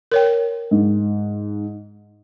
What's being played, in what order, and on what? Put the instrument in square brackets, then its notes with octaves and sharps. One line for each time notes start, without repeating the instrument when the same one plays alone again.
[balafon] A#4 C#5 G5
[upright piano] G#2